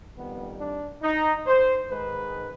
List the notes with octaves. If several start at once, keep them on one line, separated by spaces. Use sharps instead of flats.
F2 D#3 G3 B3
D4
D#4
C5
G#2 D#3 G#3 B4